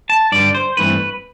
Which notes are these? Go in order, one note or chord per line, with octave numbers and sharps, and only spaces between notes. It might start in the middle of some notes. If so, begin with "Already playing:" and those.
A5
G2 D3 G3 D5
C5
G2 E3 A3 C4 B4